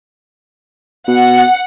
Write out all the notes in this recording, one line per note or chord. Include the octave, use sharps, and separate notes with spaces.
B2 F#5